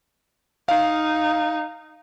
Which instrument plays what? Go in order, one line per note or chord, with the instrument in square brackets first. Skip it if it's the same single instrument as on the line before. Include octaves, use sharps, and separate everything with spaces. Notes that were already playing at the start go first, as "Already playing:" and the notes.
[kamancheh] D#4 [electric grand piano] F5